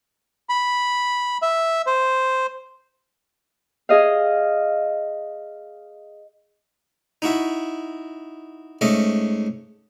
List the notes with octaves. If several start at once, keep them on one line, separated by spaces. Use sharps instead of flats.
B5
E5
C5
G#4 D#5 F5
D#4 E4 F#4 E5
G#2 A3 C#4 D#5 E5 D6